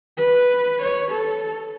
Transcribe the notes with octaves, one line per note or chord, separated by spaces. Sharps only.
B4
C#5
A4